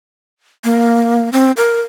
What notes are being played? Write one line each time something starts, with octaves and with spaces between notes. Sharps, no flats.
A#3
C4
A#4